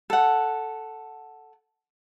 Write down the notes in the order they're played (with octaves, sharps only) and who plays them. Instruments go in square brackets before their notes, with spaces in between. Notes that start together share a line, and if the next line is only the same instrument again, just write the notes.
[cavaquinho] A4 F#5